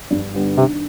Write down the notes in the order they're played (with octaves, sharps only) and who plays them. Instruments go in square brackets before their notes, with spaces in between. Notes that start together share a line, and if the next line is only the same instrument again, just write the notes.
[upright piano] G2
D3 G3 B3
[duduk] C3 [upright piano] D#3